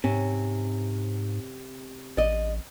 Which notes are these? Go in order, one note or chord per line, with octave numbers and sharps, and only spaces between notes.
G#2 C3 C#4
A1 D5 D#5